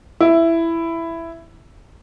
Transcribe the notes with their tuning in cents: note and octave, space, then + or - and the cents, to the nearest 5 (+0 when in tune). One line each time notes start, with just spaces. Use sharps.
E4 +10